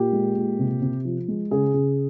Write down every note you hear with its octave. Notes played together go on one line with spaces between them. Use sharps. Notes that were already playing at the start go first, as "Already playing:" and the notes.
Already playing: A#2 G4
G#3
A#2
C3
C3
F3
G#3
C#3 G#4
C#3